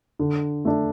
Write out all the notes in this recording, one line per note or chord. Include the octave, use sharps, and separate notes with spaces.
D3
A3 D4